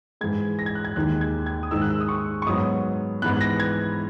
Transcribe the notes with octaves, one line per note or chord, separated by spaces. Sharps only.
G#2 E3 G#3 G#6
A#6
G#6
F#6
G#6
D#2 D#3 G#3 D#4 F#6
G#6
G#6
D#6
G#2 D#3 G#3 D#4 E6
F#6
E6
D#6
C#6
C#6
G#2 F#3 B3 D#6
G#2 E3 B3 F#6
A#6
G#6